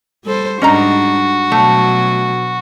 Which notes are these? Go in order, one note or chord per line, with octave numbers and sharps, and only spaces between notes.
G3 A4 C5
G#2 G3 C#4 D4 F#4 D#5 A#5
B2 F#3 A3